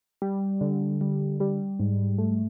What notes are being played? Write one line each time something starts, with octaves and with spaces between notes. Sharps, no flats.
G3
D3
G3
G3
G#2
A3